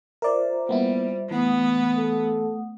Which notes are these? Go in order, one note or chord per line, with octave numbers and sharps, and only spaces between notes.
F4 A#4 C5 D5 E5
G3 A#3 B3 E4
E3 A3 B3 F#5 D#6
A4